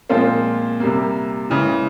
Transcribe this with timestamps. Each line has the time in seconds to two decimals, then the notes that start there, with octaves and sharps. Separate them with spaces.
0.10 A#2 F3 G#3 C4 F4
0.80 C3 G3 A#3
1.50 C#3 E3 G#3